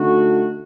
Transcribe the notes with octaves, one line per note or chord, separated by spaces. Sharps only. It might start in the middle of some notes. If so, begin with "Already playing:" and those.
Already playing: D3 A3 D#4 F#4